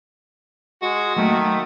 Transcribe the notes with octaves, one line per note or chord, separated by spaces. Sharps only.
G#3 F#4
D#3 F#3 A3 A#3